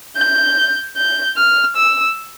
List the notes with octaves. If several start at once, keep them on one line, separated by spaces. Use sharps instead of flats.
G6
G6
F6
E6